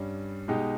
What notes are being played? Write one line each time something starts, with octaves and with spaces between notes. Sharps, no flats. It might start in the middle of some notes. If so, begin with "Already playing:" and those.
Already playing: G2 G3 C#4
B2 G#3 D#4 G4